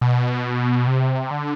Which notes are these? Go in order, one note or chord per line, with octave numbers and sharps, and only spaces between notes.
B2
C3
D3